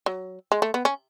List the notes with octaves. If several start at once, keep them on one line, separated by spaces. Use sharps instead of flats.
F#3
G#3
A3
B3
C#4